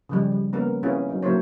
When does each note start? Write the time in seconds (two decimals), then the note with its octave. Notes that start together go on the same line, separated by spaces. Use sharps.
0.09 C#3 F3 G3
0.32 G3
0.53 A#3 B3 C#4 A#4 B4
0.83 C4 C#4 E4 F4 G#4 B4
1.09 F#3 D#4
1.23 D3 F#3 A#3 E4 C5 C#5